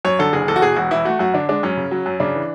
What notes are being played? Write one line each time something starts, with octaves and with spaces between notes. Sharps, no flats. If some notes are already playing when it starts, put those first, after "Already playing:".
F#2 C#5
D3 A4
F#1 G#4
E2 A4
F#4
B2 G#4
E1 F#4
E3 E4
A3 F#4
F#2 F#4
D3 D4
G#3 D4
F#2 C#4
C#3
F#3
F#2
C#3 D4
E3